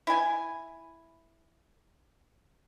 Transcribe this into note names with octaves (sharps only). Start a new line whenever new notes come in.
E4 G#5